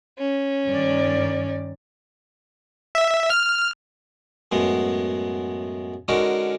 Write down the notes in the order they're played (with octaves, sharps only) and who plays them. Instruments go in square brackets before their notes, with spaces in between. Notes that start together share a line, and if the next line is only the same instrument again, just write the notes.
[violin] C#4
[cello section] G2 D#3 D5
[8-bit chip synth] E5
F6
[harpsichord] F#2 A2 G#3 B3
D3 G#3 C#4 D#4 F#4 A#4